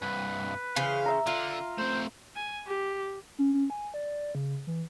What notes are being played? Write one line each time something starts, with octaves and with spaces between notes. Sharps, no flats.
C2 G2 B4
C#3 E3 C5 F5
E5 A#5
D3 F4
A3 C4 C5
G#5
G4
C#4
C#4
G#5
D5
C#3
E3